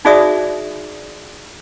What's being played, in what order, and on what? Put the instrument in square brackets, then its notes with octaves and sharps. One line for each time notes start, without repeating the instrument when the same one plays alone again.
[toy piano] D#4 F#4 G#4 D5 E5 D#6